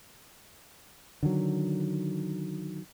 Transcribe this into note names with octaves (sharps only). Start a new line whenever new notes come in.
D3 D#3 F#3